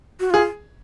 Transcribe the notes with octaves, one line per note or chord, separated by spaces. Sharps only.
F#4
F4 G#4